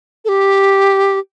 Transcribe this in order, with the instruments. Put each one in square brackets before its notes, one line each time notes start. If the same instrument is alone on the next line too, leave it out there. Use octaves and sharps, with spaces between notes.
[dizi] A4
G4